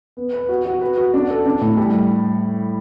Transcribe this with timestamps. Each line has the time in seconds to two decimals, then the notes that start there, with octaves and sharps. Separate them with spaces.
0.17 B3
0.33 B4
0.49 F#4
0.65 F#4
0.81 B4
0.97 F#4
1.14 D4
1.30 A4
1.46 D4
1.61 A2
1.77 G3